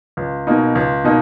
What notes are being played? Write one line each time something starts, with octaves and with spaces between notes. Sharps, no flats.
C#2
B2 A#3 D#4
C#2
B2 A#3 D#4